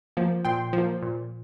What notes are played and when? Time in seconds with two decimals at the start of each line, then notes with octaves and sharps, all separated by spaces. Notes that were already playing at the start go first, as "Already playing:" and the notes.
0.17 F3 A#3
0.45 A#2 G5 C6
0.73 F3 A#3
1.02 A#2